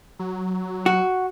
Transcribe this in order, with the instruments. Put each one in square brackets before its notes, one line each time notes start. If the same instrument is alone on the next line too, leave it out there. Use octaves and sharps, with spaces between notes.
[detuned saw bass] F#3
[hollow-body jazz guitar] F#4